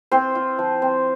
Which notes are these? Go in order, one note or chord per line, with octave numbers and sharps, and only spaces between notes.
C4 F4 C5
F4
F3
C4